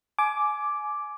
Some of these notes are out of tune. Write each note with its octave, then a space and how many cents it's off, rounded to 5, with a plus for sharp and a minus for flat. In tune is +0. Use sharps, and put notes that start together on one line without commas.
G#5 +25 D6 +0